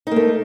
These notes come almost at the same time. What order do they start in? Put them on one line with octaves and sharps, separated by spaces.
D#4 A#3 A3